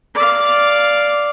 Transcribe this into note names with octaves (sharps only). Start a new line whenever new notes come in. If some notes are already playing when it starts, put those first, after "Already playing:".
D5 F5